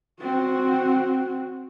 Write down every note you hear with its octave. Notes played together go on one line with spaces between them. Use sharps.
C4 F#4